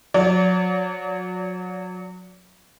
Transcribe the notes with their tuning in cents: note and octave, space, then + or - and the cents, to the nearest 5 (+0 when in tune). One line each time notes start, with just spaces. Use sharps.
F#3 -30 D5 -45